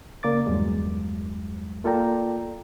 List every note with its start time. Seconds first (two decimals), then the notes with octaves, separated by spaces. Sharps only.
0.23 C#3 A#3 D5 D6 A6
0.46 E2 G2 F#3 G#3
1.84 A#3 F4 A4 D5 G5 A#5